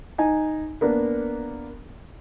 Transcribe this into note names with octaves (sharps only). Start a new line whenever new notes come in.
D#4 G#5
A#3 B3 D4